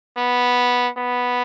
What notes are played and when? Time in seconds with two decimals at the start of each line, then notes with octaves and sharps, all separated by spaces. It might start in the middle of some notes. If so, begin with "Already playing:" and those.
0.17 B3
0.97 B3